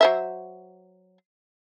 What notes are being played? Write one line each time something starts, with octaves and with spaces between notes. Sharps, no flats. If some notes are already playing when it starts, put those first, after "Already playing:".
F#3 C5 E5